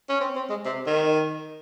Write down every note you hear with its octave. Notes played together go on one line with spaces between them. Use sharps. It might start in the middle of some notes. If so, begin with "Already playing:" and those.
C#4
C4
C4
G#3
C3
D#3